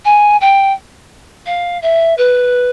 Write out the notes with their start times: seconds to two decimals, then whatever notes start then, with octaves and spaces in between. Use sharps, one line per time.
0.05 G#5
0.41 G5
1.46 F5
1.82 E5
2.17 B4